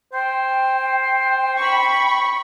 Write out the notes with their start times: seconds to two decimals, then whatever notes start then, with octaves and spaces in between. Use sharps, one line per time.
0.14 C5 G5
1.58 B5 C#6